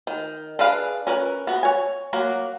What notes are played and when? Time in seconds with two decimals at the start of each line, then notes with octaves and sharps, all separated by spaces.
0.07 D#3
0.59 D4 G#4 B4 F5
1.07 C#4 A#4 B4
1.47 B3 F#4
1.63 C#5 G#5
2.13 F#3 A#3 F#4